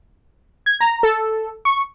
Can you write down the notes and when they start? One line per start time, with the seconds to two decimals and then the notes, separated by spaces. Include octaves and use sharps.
0.66 G#6
0.81 A#5
1.03 A4
1.65 C#6